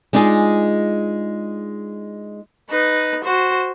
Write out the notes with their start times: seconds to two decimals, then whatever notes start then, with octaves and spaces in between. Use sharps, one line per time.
0.13 G#3 D4 D#4 F4 G#4
2.70 D#4 B4
3.24 F#4 C5